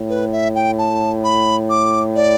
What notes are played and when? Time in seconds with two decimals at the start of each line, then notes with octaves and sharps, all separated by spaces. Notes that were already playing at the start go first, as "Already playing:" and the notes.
Already playing: A2
0.09 B4
0.32 E5
0.55 G5
0.78 A5
1.24 B5
1.69 D6
2.15 D5